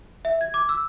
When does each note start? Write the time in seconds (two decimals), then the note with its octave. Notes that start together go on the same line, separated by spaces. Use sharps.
0.25 E5
0.41 G#6
0.54 D6
0.69 E6